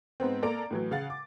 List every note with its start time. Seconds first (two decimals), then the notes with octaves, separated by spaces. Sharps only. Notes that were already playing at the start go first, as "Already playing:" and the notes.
0.20 G#2 B3 C4
0.42 A#3 A4 D5 A#5 D7
0.70 A2 E3 F#3
0.91 C#3 F5 F#5 A6
1.10 D6